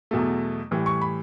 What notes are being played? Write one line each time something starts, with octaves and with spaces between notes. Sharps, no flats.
E2 B2 F#3 A3
A2 E3 G3
C#6
B5